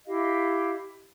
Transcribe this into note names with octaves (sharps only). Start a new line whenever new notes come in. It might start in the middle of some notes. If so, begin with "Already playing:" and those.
E4 G4 D#5 F5